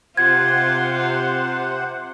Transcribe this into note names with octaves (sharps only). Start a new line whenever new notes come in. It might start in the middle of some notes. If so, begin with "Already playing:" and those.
C3 F4 C5 F#5 G#6